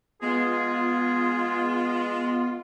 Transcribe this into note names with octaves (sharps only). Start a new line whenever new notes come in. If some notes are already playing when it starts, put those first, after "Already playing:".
G#3 B3 F4 G#4